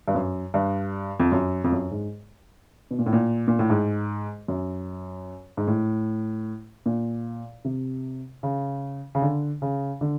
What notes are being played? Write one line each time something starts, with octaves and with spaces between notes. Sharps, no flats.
G2
F#2
G2
F2
F#2
F2
F#2
G#2
B2
A#2
A2
A#2
A#2
A2
G#2
F#2
G#2
A2
A#2
C3
C#3
C#3
D3
C#3
D3